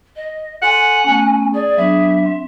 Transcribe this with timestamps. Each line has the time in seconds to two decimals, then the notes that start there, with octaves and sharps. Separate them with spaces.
0.16 D#5
0.62 A4 F#5 G#5 C6
1.04 A3 B3 C#4
1.54 G#4 D5
1.77 F#3 B3 D4 E5
2.26 C4